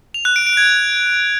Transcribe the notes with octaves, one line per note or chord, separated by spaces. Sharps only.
F7
F#6
D7
D7
G#6